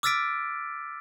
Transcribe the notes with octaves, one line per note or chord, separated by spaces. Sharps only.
D6 E6 F6 A6 B6 D7